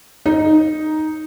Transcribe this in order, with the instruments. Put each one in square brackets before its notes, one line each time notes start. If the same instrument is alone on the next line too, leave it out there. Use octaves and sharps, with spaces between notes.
[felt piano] D#4